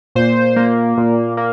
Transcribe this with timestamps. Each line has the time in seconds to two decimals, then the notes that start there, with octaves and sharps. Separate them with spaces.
0.15 A#2 C5
0.56 A#3
0.97 A#2
1.37 A#3